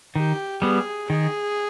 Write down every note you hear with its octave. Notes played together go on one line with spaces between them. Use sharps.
D#3 G4
G3 B3 G#4
D#3 G#4